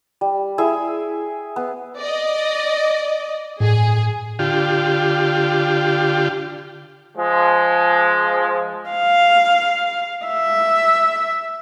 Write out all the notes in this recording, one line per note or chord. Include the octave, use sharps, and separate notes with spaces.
G3
E4 G#4 E5
B3
D5 D#5
A2 G#4
D3 F4 G4
F3 G#3
F5
E5